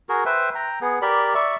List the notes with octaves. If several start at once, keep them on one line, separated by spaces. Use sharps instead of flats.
F#4 G#4 A#4
B4 C5 E5 G5
G5 A#5
B3 G#4
G4 A#4 D5 B5
D5 E5 C#6